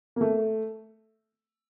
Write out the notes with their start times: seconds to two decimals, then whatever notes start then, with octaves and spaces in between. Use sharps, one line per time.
0.16 A#3
0.21 A3